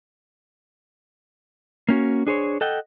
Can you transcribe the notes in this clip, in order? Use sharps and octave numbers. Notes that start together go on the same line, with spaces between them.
A#3 C#4 F#4
D4 G#4 C5 C#5
A4 D#5 F#5 G5